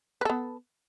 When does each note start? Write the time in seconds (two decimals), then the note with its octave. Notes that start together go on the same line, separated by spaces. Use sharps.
0.21 B4
0.25 A4
0.30 B3